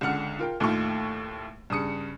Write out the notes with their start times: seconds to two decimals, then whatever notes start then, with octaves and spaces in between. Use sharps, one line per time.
0.01 C#2 D3 F#5 F6 C#7
0.39 F4 A#4 G5
0.60 D#2 A2 A3 D#4 F4 C#6
1.70 G2 C#3 D#6 C#7